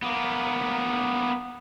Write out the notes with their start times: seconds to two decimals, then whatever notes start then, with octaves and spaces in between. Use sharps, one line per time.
0.03 A#3 B3